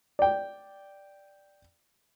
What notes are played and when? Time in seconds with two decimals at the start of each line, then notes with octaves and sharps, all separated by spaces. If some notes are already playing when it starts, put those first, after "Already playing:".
0.19 D5 G5